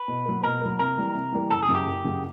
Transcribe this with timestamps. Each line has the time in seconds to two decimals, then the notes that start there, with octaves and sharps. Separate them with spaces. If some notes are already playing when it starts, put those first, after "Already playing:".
Already playing: B4
0.08 B2
0.26 F#3 A#3
0.43 B2 A#4
0.62 F#3 A#3
0.79 C3 A#4
0.97 E3 G3 A#3
1.14 C3
1.33 E3 G3 A#3
1.50 F#1 A4
1.63 G#4
1.69 F#2 C#3 F#3
1.75 G4
1.87 F#1
2.04 F#2 C#3 F#3